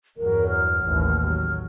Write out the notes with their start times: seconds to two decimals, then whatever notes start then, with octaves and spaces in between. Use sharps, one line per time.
0.17 E2 G2 F#3 A#4
0.50 F6
0.83 A1 D#2
1.24 F#3